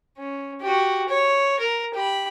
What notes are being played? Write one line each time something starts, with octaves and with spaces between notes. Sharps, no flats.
C#4
F#4 G4
C#5
A#4
G4 B5